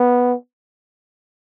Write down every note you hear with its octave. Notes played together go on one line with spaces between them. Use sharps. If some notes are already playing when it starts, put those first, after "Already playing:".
Already playing: B3